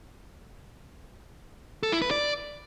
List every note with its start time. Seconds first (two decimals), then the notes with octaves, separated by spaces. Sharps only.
1.83 A4
1.92 E4
2.02 B4
2.11 D5